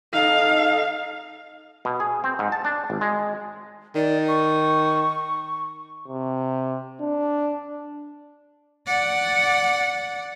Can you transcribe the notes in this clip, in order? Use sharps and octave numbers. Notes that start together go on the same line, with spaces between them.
D#4 A4 D#5 F5
B2
G#4
C4
G#2
A5
D4
G#1
G#3
D#3 D5
C#6
C3
D4
D5 F#5